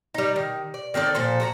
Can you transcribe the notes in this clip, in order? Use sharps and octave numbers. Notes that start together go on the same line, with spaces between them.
G3 D#4
D#3
D5
D#3 C4 D4 A4
A#2 F3 A4 C5
F#4 C#5 A#5